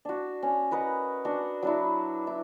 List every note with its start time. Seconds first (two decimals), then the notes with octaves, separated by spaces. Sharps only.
0.05 D4 F#4
0.43 C#4
0.71 A#4 B4 D#5 F#5
1.25 D4 F#4 F#5
1.63 F#3 D4 E4
2.27 E4